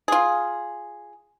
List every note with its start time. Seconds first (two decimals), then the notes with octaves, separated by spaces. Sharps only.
0.08 F4 G#4